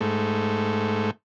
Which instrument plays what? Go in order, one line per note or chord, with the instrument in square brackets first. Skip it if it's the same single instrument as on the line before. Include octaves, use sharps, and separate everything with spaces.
[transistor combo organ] G#2 A3